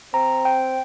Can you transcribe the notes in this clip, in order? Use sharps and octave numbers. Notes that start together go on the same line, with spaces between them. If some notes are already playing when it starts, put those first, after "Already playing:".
C4 A#5
G5